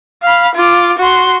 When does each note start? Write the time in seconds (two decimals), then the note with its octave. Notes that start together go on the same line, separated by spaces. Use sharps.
0.23 F5 B5
0.55 F4 D6
0.98 F#4 C6